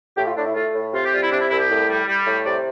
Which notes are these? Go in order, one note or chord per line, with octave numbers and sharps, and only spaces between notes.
A2 G4
F4
A2 D4
E4
A3 F4
A2
C3 F4
G4
G3 F4
E4
C3 D4
E4
C2 E4
G4
A2
G3
G3
A2
C3 D5